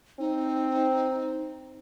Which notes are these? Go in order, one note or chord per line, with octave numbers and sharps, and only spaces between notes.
C4 D#4